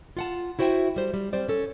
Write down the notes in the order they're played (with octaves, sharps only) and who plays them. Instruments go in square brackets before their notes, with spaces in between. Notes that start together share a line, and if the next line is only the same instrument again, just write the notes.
[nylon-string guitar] F4 F#5 A5
E4 F#4 C5 E5 G5
G3 C5
G3
G3 C4 C5 D5
C#4 A4